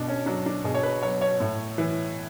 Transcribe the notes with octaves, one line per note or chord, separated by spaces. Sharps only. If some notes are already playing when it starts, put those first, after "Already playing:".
Already playing: B2 D4
C#4
F#3 D4
D4
B2 G#4
C#5
B4
F#3 C#5
C#5
A2
E3